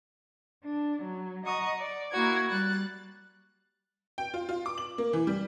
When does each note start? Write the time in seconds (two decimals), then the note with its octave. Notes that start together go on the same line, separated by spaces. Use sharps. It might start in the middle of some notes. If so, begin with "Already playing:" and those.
0.66 D4
1.03 F#3
1.45 D#5 F#5 A#5 C#6 D#6
1.79 D5
2.12 A#3 E4 F#4 G#6
2.49 G3 F#6 A6
4.18 G5
4.34 F4
4.49 F4
4.66 D6
4.78 F#7
4.98 A#3
5.13 E3
5.27 G3